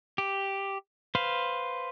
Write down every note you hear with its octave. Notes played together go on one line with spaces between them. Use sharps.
G4
B4 C5 F5